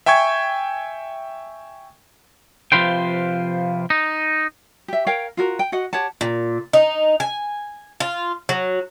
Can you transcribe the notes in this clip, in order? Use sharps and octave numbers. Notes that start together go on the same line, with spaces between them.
E5 G5 G#5 C#6 G#6
C3 F3 F4 B4 C5 G5
D#4
G4 E5
A#4 C#5 F5 G5
F4 F#4 A#4
G5
F#4 D#5 F#5
G4 C#5 F#5 A5
A#2
D#4
G#5
F4
F#3